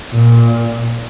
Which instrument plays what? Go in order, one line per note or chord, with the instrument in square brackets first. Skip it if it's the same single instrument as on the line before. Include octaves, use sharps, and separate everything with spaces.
[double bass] A#2